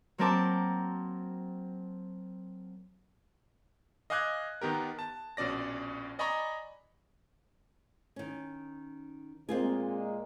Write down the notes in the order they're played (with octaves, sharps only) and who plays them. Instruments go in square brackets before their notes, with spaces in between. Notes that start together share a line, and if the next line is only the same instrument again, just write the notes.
[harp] F#3 A#3 C4 A#4 A5 D6
[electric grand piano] D#5 F5 G#5 D6 F#6 G#6
D#3 B3 G4 A#4
A5
A#1 B2 C#4 D5 A#6
D5 D#5 G#5 A#5 B5 C#6
[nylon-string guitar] D#3 C#4
[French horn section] A#2 G#3 A#3 [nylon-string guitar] C4 F4 G#4